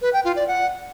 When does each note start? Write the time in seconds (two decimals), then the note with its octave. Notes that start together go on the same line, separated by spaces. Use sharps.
0.01 B4
0.13 G5
0.24 F4
0.36 D5
0.47 F#5